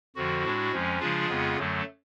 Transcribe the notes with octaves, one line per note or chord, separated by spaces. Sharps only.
F2 D3 F3 F#4
A2 G#3 D4
F2 F3 G#3 C#4
C#3 F3 G#3 D4 F4 G#4
F2 C#3 G#3 B3
F#2 D3 F#3 A3